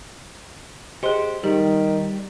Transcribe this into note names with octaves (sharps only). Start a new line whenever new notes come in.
G4 G#4 C5 D#5
D#3 G3 D#4 G4